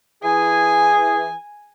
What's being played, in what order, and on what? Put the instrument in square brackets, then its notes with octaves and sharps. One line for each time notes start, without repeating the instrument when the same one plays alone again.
[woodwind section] E3 G#4 [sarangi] G#5